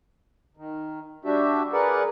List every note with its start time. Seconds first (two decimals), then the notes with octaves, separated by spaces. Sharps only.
0.57 D#3
1.25 G3 D4 F#4 G4 E5
1.73 G#4 A#4 B4 D5 F#5